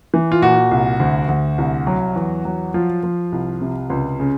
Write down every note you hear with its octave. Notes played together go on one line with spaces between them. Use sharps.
E3
F4
A#2 F#4
C2
D2
D2
C2
F#3
E2
F#3
F3 F4
F3
C2
C3
C#2
C#3